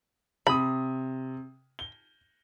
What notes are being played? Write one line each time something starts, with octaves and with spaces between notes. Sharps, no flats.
C3 B5 D#6
G7